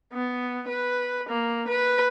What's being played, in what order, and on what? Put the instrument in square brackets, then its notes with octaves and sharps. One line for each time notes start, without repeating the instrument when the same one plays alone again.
[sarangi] B3
B4
A#3
B4